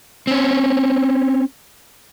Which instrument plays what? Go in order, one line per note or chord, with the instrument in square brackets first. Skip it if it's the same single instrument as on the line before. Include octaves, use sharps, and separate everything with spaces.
[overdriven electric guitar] C4 C#4